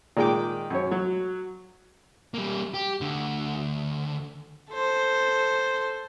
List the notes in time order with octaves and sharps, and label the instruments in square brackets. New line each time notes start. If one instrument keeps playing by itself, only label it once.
[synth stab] A#2 G#3 D6 [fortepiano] D#3 G5
[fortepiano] F#2 C#5
F#3
[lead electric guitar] G3 A#3
G4
D2 D3
[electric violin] A4 C5